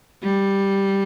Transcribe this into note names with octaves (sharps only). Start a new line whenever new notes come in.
G3